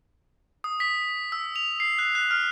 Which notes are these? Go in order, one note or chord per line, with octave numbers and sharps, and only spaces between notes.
D#6
B6
E6
F7
C7
F#6
F#6
F6